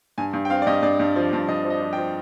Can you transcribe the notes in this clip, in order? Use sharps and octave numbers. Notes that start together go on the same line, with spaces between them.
G2 G#5
G2
G5
C4 F5
D5
G2 D#5
G2 D5
G2
F3
G2
G2 D#5
F3
D#5
F3
G5
F3